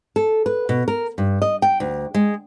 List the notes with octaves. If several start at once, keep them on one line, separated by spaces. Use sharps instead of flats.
A4
B4
B2
A#4
G2
D#5
G5
D2
G#3